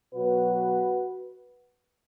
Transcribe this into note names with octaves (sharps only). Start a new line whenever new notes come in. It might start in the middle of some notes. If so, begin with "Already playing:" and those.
B2 F#3 B3 F#4 B4